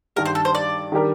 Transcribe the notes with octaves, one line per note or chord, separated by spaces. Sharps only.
G2 D#3 G3 A#4
C5
A4
C5
D5
D#3 G3 D4 G4 A#4